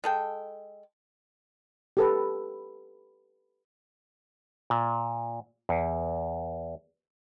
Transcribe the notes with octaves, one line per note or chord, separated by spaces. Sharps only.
G#3 A4 G5
G4 A4 B4
A#2
E2